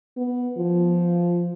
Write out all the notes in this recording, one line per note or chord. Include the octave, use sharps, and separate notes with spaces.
B3
F3